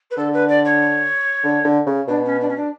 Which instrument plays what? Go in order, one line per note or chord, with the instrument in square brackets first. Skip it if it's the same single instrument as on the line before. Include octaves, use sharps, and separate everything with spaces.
[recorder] B4
[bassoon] D3 [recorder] A4
[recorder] B4
D5
C#5
[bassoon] D3
D3
C#3
[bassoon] B2 [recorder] D4
[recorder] C#4
D4
C#4
D4